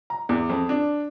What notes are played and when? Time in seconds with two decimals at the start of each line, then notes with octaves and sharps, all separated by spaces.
0.10 A#5
0.29 E2
0.49 F2
0.69 D4